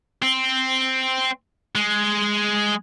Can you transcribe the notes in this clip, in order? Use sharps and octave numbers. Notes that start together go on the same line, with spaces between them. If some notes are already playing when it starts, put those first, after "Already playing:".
C4
G#3